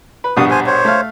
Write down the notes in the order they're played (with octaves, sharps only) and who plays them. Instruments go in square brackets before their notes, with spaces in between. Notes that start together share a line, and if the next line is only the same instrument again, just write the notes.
[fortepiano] B4
[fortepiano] A#1 G2 B2 [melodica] D#6
[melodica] C5 G#5
C5 C#5
[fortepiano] A3 F5